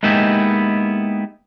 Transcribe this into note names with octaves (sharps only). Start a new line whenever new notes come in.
G#3 A#3 B3 D#4 E4 G4